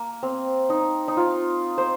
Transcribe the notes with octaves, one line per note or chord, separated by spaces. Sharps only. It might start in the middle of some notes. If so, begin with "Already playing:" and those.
Already playing: A#3
C4
D#4
D#4
F4
C5